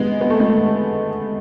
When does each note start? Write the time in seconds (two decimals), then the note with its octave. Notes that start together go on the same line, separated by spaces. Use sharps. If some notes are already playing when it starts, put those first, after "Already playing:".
Already playing: G#3 B3
0.21 B3
0.30 A3
0.40 G#3
0.50 A3